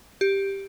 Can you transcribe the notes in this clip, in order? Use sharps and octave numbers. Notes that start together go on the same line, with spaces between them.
G4